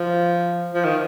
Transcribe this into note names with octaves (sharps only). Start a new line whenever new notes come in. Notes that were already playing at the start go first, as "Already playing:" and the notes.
Already playing: F3
F3
D#3